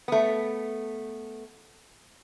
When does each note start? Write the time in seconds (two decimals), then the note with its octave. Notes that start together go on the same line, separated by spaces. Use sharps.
0.08 A3 B3